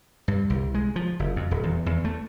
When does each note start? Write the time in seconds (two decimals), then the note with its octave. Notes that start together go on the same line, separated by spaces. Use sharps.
0.28 G2
0.50 C2
0.74 G#3
0.96 F3
1.19 F#1
1.36 F2
1.51 D#1
1.63 E2
1.86 E2
2.05 A3